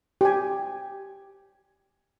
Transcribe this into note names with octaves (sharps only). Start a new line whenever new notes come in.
G4 G#5